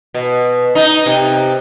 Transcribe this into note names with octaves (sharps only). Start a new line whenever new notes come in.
B2
D#4
C3